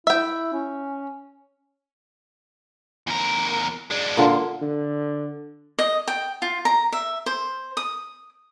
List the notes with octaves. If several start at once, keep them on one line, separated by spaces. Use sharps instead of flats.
E4 E5 G5
C#4
E2 A#4
G#3 D4
A#2 D3 C6
D3
D#5
G5
F4
A#5
E5
C5
D#6